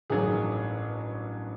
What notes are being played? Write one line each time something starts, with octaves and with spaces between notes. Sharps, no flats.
A1 G2 D#3 F#3 G#4